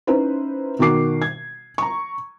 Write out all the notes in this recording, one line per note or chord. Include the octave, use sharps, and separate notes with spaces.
C#4 D#4 E4 B4 C5
B2 D#3 F#4 D6 C7
G#6
A#5 C#6